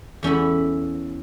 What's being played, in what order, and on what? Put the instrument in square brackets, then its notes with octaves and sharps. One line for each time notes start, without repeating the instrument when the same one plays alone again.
[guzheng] E2 C#4 A4 B5